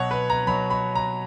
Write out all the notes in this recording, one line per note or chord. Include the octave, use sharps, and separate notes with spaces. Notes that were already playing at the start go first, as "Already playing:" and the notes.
Already playing: B2 F#3 C#5 F#5
B4
A#5
B2 F#3 B5
B5
A#5